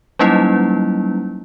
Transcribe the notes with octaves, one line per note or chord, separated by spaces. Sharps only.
F#3 G3 A#3 C#4 D#4 E4